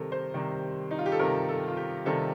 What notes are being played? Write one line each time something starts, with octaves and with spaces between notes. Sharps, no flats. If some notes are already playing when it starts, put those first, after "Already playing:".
Already playing: C3 D#3 G3 A4 A#4
C5
C3 D#3 G3
D#4
F4
G4
A4
C3 D#3 G3 A#4
A4
F4
G4
C3 D#3 G3 A4